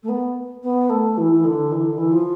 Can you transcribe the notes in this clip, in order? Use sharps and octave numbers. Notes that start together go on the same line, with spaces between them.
A3
B3
B3
A3
E3
E3
D3
E3
D3
E3
F3